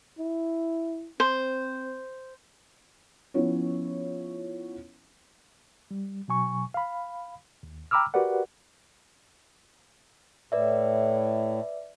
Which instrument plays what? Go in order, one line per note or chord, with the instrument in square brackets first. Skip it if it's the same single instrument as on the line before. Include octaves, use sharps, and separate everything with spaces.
[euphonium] E4
[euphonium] C4 [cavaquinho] C5
[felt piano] F3 B3 C#4 E4 F4 C#5
[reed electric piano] G3
B2 F#3 G#5 C#6
F5 B5
D#2
G5 A#5 B5 D6 E6 F6
F#4 G4 A#4 B4 D5 F#5
[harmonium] A2 [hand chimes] B4 D5 E5